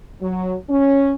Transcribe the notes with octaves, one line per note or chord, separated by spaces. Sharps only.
F#3
C#4